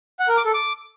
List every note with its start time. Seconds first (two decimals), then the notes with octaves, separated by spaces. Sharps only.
0.20 F#5
0.28 A#4
0.37 D6
0.45 A4
0.54 D6